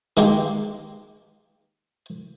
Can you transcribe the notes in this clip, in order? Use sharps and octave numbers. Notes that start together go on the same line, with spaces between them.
D#3 G#3 A#3 G4